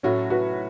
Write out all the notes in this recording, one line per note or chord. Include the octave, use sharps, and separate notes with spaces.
A2 F#3 A3 C#4 F#4
F#4 B4